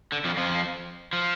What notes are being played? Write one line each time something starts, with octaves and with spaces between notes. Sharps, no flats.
D3
F2 F3
F2 F3
F3